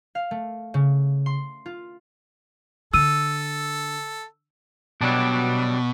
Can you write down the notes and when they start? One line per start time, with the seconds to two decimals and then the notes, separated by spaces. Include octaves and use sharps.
0.15 F5
0.31 A3
0.74 C#3
1.26 C6
1.66 F4
2.94 D3 A4 E6 D#7
5.01 B2 F#3 G3 D4